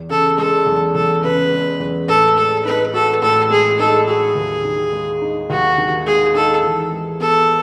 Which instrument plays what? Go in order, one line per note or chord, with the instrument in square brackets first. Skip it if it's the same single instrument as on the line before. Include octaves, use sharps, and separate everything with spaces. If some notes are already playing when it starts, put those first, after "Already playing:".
Already playing: [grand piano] E2
[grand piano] C#3 [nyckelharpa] A4
[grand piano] G#3 [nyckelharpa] A4
[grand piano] E2
[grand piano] E2 [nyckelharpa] A4
[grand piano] C#3 [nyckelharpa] B4
[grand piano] G#3
E2
[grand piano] A2 [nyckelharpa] A4
[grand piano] G#3 [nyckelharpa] A4
[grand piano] D#4 [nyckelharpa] B4
[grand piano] F#4 [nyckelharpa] A4
[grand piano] A2 [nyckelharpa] A4
[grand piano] G#3 [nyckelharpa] G#4
[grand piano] D#4 [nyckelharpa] A4
[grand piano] F#4 [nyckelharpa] G#4
[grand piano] D#2
D#3
G#3
D#4
[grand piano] D#2 [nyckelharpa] F#4
[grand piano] D#3
[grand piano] G#3 [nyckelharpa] G#4
[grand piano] D#4 [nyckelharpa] A4
[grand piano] E3
G#3
[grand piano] B3 [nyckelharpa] A4